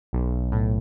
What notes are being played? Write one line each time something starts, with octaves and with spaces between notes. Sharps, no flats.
B1
A2